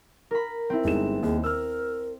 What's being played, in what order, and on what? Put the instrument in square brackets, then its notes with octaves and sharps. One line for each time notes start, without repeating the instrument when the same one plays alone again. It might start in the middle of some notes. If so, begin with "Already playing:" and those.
[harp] A#4 B5
C4 E4
[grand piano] G1 G#3 E7 [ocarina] D#4
[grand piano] D#2 [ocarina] G#4
[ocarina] A#4 [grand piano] E6 F6